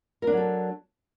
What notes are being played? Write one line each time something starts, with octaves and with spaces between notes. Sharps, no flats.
F#3 D4 A4 A#4